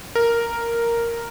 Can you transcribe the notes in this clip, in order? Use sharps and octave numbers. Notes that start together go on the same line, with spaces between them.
A#4